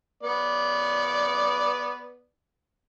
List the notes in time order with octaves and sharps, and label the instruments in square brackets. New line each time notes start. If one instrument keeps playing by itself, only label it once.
[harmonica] B3 D5